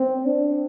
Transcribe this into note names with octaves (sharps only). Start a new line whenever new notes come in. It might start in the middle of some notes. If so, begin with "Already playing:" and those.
Already playing: C4
D4